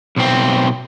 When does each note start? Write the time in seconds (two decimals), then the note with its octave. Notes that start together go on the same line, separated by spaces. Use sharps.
0.17 B1 C4